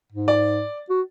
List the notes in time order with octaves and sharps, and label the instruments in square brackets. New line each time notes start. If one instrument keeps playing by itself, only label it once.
[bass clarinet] G#2
[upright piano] D5
[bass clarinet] F#4